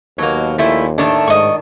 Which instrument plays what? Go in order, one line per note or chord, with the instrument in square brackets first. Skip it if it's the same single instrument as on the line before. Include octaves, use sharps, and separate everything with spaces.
[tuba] D#2 [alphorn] B2 [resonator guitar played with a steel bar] F#3 A#3
[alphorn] A#2 [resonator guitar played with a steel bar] F3 A3 E4
[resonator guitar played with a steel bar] A2 D#3 D4 [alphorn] A3
[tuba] G#2 [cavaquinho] D#5 C#6